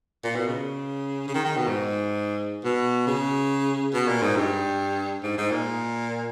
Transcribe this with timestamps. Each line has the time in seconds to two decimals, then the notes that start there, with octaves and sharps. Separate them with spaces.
0.24 A#2
0.35 B2
0.48 C#3
1.28 C#3
1.35 D#3
1.45 D#3
1.56 B2
1.67 G#2
2.64 B2
3.07 C#3
3.94 B2
4.08 A#2
4.22 G#2
4.37 G2
5.23 G#2
5.38 G#2
5.52 A#2